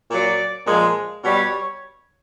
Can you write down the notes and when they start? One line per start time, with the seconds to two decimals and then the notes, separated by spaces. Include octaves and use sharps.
0.10 A#2 F#3 D5
0.66 A#2 F3 G#3
1.22 B2 G3 C#5